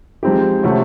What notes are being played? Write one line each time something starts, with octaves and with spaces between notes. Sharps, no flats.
F3 G#3 C4 D#4 G4
C3 F3 A3 C#4 F#4